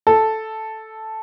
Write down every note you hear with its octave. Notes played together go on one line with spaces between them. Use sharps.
A4